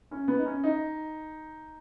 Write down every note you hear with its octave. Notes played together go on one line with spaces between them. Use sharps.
C#4
B3
D#4
C#4
D#4